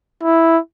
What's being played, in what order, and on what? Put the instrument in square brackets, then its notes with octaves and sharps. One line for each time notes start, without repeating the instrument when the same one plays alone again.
[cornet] E4